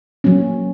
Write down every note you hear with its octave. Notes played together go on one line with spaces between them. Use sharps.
F#3 A#3 C#4